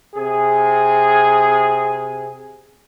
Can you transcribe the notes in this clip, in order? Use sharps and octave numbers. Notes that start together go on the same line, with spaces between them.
C3 G#4